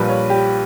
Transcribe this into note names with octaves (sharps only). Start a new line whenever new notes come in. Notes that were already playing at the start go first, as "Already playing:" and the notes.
Already playing: A#1 A#2 G3 B4
C#5
G4